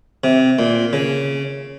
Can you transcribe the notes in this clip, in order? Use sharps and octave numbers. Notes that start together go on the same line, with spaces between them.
C3
A#2
C#3